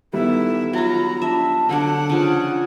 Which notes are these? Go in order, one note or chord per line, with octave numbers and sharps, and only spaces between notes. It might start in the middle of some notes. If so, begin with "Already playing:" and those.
D#3 G3 B3 E4 A4 E5
F#3 F4 F#4 A#5 B5
D4 E5 A5
D3 F#3 D4 F#5
C#3 F3 D4